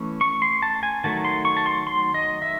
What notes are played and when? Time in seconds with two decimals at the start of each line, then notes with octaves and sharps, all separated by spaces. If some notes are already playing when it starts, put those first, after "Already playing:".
Already playing: E3 A3 C#4
0.21 C#6
0.42 C6
0.62 A5
0.83 G#5
1.04 D#3 F#3 A3 A5
1.25 C6
1.45 C#6
1.57 A5
1.66 C6
1.87 C6
2.14 D#5
2.42 E5